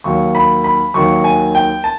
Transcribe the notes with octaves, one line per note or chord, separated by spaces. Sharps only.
D#2 D#3 F#3 C#6
B5
B5
D#2 D#3 F#3 C#6
G#5
G5
A5